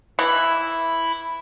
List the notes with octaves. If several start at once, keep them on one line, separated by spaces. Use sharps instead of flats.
E3 E4